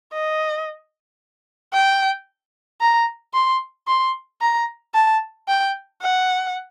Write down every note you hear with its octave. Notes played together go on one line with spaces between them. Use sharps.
D#5
G5
A#5
C6
C6
A#5
A5
G5
F#5